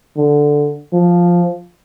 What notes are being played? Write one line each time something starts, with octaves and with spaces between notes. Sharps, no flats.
D3
F3